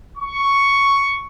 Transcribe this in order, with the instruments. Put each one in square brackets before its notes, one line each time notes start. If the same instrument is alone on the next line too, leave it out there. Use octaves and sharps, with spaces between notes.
[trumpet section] C#6